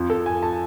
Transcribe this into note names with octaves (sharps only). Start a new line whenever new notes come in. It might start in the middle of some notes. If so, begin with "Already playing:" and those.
Already playing: F2 F3
A4
G#5
A5